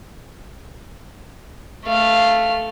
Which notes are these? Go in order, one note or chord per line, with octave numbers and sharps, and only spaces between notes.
A3 F5